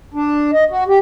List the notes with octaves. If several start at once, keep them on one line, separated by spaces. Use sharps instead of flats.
D4
D#5
F#4
G4